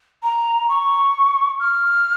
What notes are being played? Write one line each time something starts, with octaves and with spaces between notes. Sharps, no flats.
A#5
C#6
F6